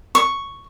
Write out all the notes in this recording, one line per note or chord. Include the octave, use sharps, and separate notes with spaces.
C#6